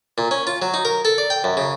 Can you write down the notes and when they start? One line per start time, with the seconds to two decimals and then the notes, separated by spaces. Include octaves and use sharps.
0.18 A#2
0.31 C#4
0.47 F4
0.62 F#3
0.74 D#4
0.85 A#4
1.05 A4
1.18 D5
1.30 G5
1.44 F#2
1.57 C#3